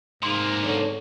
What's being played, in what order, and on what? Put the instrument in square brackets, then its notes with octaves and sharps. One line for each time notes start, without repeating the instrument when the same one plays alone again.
[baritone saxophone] G#2 [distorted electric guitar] C3 A#3 [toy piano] C6
[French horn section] D3 A4 C#5